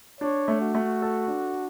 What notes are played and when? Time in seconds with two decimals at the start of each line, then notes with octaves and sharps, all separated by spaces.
0.21 D4 C#5
0.48 A3
0.61 F#4
0.75 A3
1.02 A4
1.28 D4